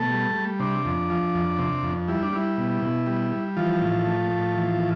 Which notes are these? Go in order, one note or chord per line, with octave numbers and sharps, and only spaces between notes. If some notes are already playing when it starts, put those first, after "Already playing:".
Already playing: B2 A3 A4
G3
G3
C3 D4
F2
F3
F2
C3
F2
G3 E4
D4
G3 E4
B2
B2
G3
G3
E3 F3 F4
A2
A3
A2
E3
A2